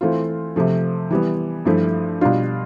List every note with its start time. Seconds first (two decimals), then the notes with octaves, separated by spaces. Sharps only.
0.01 E3 A3 C4 F4
0.56 C3 F3 A3
1.10 E3 G3 B3
1.65 G2 F3 A3 E4
2.21 B2 G3 D4 F4